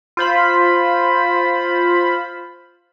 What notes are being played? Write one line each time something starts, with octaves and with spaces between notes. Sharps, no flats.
F4 C5 B5